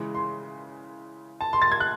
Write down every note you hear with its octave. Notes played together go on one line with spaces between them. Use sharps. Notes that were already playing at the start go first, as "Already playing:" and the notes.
Already playing: C#3 E3 G#3
C6
A5
C6
A6
G#6
F#6